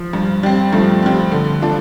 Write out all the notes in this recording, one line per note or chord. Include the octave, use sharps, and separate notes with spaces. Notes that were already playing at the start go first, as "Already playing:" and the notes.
Already playing: F3
G2
G3 C4
G2 F3 A3
G3 C4
D3
F3 A3 D4